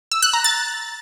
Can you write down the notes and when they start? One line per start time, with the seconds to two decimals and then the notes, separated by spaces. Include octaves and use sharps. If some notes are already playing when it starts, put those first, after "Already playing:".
0.12 E6
0.22 F#6
0.33 A#5
0.44 A6